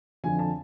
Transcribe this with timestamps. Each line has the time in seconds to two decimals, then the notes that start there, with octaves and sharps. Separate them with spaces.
0.24 F2 D3 F3 G#5
0.39 A5